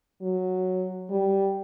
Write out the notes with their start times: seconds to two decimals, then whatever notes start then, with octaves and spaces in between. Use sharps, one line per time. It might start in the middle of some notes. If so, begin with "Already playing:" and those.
0.22 F#3
1.10 G3